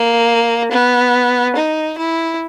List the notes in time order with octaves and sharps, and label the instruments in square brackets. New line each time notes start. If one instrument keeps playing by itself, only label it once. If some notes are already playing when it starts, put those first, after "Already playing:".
Already playing: [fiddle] A#3
B3
D#4
E4